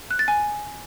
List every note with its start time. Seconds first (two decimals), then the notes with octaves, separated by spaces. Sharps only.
0.11 F#6
0.19 A6
0.28 G#5